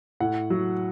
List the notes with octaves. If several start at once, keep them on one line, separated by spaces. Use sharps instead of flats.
A2 F#5
F#3